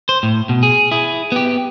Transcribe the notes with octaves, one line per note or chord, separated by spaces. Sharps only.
C5
A2
B2
G#4
E4 G#4
B3 G4